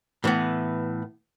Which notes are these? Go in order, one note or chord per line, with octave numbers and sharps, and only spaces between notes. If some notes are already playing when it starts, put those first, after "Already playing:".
A2 E3 B3